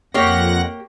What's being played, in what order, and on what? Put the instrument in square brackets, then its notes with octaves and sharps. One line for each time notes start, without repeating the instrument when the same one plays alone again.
[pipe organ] F2 F#5 A#6 [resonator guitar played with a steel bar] A#3 G4 C#5